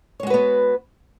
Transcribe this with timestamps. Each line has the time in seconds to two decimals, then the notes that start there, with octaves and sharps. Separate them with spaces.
0.20 C#5
0.23 G#3
0.27 F#4
0.30 B4
0.34 B3